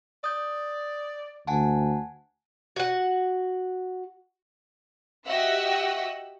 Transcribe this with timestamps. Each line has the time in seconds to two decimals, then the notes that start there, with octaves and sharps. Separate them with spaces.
0.24 D5 D#6 G6
1.47 D2 F#5 G#5 A5
2.76 F#4 F#5
5.26 F#4 G4 D#5 E5 F#5 E6